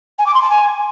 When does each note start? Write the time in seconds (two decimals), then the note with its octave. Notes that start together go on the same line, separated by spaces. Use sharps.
0.18 G#5
0.26 D6
0.34 C6
0.42 A5
0.50 G#5